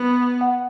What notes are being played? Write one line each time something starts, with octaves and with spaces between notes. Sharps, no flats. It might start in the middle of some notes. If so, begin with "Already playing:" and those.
Already playing: B3
F#5